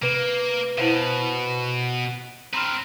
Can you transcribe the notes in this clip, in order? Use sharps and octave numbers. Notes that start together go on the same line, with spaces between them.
C3 A#3 B4
B2 E4 C5 F5
C4 B4 A#5 C6 F6